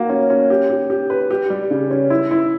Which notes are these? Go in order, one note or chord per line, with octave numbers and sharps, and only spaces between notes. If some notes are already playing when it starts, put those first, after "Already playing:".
Already playing: A#3 F#4
C#4
C#4
G4
G4
G4
B4
G4
G3
C#3
C#4
E4
E4